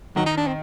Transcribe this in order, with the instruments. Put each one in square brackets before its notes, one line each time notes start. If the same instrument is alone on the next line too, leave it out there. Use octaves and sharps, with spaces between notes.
[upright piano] D#3 [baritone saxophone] F#3
[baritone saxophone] D#4
D4
C4